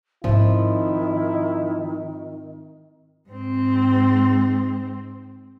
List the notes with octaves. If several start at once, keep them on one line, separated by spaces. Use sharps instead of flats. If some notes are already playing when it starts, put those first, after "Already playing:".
G#2 D#3 F3 C4 E4
G#2 C4